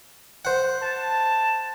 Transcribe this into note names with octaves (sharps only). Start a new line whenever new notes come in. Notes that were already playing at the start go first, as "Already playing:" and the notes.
C5 F#5
A5